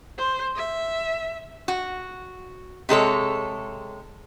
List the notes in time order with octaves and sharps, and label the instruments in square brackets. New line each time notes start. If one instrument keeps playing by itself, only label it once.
[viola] C5
E5
[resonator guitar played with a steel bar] F#4
C3 G#3 A4 C#5